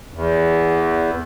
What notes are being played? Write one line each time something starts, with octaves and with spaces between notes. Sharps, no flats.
E2